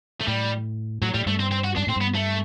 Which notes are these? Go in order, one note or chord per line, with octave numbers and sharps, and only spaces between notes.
A3
A2 G3
A2 F#3
A2 G3
G2 A3
C4
C4
F#4
G2 D4
A2 C4
G2
B3
A3